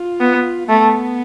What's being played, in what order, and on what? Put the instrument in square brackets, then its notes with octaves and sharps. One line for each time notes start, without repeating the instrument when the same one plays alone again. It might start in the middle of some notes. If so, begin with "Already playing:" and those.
Already playing: [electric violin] F4
[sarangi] B3
[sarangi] A3 [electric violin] B3